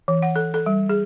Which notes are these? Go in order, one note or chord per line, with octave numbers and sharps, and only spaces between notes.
E3
F#5
A4
A4
G3
G#4